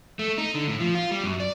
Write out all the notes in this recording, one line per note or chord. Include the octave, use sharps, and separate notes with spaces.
A3
D#4
D3
A2
F3
F4
G3
F#2
D5